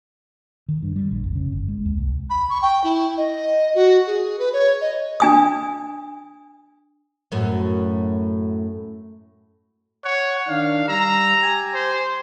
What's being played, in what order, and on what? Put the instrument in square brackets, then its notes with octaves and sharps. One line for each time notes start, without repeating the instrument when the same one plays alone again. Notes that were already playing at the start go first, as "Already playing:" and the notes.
[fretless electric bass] D#3
G2
G3
A#1
F1
C#3
G1
G#3
D#2
C2
[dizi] B5
C#6
G5
E4
D#5
F#4
G#4
B4
C#5
D#5
[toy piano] D4 G#5 D#6
[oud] F#2 A2
[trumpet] C#5 [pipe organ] F#5
[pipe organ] D#3 D4 [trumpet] F5
[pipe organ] G3 E6 [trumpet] A#5
[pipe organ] G4 G#5
[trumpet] C5